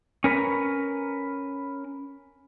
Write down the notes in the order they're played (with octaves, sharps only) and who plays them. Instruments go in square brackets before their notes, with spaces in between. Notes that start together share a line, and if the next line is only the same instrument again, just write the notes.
[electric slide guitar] C#4 A#4 B4